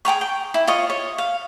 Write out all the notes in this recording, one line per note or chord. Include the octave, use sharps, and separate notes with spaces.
G#4 G5 A#5 C#6
G5
E4
F4 C#5 D#5
C#5
F5